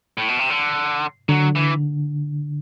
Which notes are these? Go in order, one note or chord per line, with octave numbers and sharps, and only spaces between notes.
A2
B2
C3
D3
D3 F#3
E3